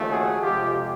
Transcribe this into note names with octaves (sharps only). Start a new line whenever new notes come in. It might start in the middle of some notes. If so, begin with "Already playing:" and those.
Already playing: D#2 C#3 F3 A3
F#4 G#4
F2 C3 F3 G#3 F4 G4